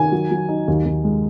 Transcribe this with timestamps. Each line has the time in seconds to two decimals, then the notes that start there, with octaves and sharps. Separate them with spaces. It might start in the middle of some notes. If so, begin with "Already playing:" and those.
Already playing: D#3 G#5
0.12 F#3
0.31 F#3
0.49 D#4
0.68 D#2
0.85 D#2
1.04 G#3